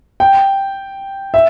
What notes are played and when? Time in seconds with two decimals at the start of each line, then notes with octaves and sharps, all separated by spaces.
0.20 G5
1.34 E5